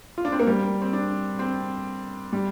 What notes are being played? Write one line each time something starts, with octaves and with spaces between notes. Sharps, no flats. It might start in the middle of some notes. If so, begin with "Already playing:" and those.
F4
D4
C4
A#3
G3
C4
D4
C4
G3